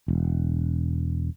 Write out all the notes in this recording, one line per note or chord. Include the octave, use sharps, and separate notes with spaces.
E1